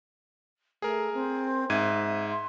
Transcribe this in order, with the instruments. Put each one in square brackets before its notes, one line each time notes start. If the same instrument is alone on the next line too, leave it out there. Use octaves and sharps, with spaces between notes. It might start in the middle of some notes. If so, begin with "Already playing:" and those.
[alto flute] A3 [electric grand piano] G#4 A#4
[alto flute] C4
[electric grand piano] G#2 G#6 D#7 [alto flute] E5
[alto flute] C6